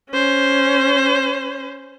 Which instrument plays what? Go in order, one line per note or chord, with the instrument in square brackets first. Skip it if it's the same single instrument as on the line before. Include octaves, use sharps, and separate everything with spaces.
[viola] C#4 C5